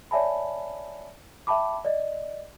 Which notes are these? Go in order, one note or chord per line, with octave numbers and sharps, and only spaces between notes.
C#5 D5 E5 G#5 A5 B5
E5 G5 A5 B5 D6
D5 D#5